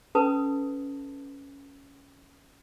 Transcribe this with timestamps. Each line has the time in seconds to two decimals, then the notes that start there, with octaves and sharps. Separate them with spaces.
0.15 C#4 A4 B4 A5 D#6